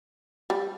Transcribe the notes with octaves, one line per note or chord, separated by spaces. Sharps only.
G3